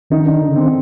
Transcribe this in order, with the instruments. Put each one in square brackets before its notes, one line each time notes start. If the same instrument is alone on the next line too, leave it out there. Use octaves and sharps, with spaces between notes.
[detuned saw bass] D#3 [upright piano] D#4
[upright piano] D4
[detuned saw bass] D3
C#3
[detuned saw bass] D3 [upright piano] C4